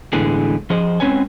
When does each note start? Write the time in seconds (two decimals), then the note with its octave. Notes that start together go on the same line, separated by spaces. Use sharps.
0.13 A2 D3 E3 G#3 B3 G#4
0.70 F3 G#4 C5 D#5
1.00 G#3 C4 C#4 B4 C#5 G#5